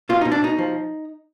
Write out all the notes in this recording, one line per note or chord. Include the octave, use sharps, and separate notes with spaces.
B2 F4
B2 D#4
D4
B2 D#4
F3